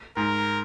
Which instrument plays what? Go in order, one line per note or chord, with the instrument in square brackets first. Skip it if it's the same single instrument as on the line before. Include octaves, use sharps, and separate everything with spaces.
[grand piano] G#2 [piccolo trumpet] A#4